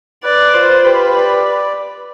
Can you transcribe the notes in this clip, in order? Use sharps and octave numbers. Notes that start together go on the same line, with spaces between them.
B4 D5
F4 C5
G4 B4
D5